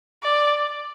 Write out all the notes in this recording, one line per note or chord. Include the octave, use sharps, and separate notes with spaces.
D5